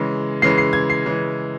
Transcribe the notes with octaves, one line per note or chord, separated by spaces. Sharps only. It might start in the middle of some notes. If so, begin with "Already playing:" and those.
Already playing: C#3 E3 G#3
C#3 E3 G#3 C7
C7
G#6
C7
C#3 E3 G#3